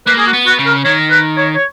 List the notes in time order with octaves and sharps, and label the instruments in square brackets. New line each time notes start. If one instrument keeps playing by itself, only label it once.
[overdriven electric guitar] A#3 [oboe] B4
[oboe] G#4
F#4
[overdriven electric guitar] B3
[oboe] F#4
[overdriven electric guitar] C#3
[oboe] A#4
[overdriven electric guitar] D#3 [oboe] C#5
[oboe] B4
C#5
C#5